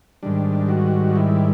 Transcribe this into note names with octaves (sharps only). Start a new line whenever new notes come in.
G#2 D#3 G3 D4
F#4
E4